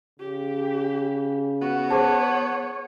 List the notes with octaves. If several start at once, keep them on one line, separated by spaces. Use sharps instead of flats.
C#3 G4
B3 F#4
G#4 C5 C#5 A5